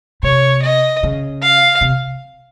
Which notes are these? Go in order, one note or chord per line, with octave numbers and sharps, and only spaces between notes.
C3 C#5
D#5
C#3
F5
C3